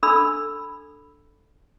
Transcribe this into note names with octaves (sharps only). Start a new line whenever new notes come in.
D4 A4 B5 E6